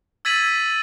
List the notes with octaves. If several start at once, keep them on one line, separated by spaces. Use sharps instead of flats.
E6 G#6 A6 B6 D#7 F#7